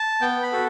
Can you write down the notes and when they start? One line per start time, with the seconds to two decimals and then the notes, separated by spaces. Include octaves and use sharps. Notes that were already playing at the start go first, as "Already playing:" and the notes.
Already playing: A5
0.21 B3 G5
0.43 B5
0.53 F#4 A4